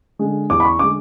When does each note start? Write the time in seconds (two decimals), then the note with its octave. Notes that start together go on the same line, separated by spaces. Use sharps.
0.19 D3 G#3
0.50 E2 D6
0.60 B5
0.65 C#6
0.79 D3 G#3 D6